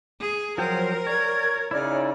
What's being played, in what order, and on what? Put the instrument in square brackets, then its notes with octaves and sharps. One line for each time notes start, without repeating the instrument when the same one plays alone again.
[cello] G#4
[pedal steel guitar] F3 F#3 G5 [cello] A#4 [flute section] C5
[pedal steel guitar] C#5 [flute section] D5 G#6
[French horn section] C#3 D5 [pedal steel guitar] D#4 E4 [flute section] C#5 D6 F6